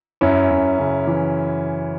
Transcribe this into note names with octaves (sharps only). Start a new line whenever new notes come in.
F#2 C#4 E4
F#2
C#3
E3